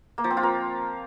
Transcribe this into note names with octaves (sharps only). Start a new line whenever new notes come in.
A#3
F3
C4
F4
A#4